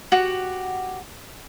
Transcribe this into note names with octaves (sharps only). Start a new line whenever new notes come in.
F#4 G4 F#5